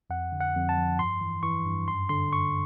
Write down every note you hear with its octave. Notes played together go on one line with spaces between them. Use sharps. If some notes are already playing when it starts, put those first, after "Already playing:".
F2 F#5
D3
F#5
F2
A5
F3
G2 C6
E3
E3 C#6
G2
F#2 C6
D3 C6
F#2 C#6